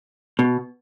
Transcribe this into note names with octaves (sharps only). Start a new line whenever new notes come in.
B2